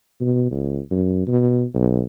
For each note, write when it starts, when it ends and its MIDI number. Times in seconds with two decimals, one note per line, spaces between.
0.21 0.50 47
0.51 0.80 37
0.91 1.26 42
1.28 1.64 47
1.74 2.02 35